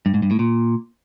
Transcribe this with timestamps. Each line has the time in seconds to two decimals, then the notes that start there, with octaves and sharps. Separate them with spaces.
0.06 G2
0.14 G#2
0.22 G2
0.31 A2
0.39 A#2